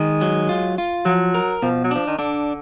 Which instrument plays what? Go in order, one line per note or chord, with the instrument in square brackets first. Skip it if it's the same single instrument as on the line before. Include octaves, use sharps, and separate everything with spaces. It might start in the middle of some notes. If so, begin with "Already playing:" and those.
Already playing: [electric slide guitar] D#3 [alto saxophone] G#3
[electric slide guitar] F#3
F4
F4
[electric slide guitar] F3 [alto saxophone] F#3
[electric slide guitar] A#4
[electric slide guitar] B2 [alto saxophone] F3
[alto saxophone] F#3
[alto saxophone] F3 [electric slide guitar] D4
[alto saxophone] D#3
[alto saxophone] D3 [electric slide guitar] D4